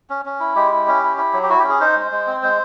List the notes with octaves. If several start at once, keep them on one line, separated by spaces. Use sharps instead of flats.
C#4
C#4
E4
G#3 G4
E4
C#4
E4
E4
F#3
G4
E4 F#4
G4
C#4
G#4
D#4 C5
G#3
G#3
C4
G#3 C5